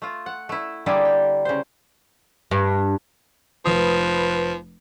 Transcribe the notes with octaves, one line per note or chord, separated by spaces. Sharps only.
A3 F4
F#5
A3 E4
D3 G3 A#3 E4 G#4 A4
G5
C#3 C5
G2
F1 F3 B4 D#6